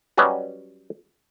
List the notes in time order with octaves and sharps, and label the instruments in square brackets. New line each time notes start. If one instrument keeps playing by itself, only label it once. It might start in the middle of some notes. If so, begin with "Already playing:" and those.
[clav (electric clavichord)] F#3 G3 C#4 B4 D#5